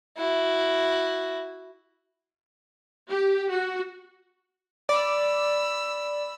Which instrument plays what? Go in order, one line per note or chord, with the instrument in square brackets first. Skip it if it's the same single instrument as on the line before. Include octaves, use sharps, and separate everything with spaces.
[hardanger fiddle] E4 F#4
[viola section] G4
F#4
[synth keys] D5 [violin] B5 E6